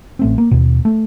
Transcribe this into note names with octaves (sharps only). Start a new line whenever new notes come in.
A1 A3 C4
A#3
D#2 B2
A3